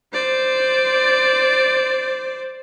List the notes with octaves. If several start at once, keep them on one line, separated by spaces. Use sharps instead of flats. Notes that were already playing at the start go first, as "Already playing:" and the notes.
C5 D5